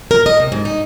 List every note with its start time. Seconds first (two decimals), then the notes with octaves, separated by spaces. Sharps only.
0.11 A#4
0.26 D#5
0.40 C3
0.52 G#2
0.65 D#4